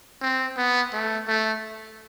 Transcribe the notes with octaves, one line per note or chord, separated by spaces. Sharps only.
C4
B3
A3
A3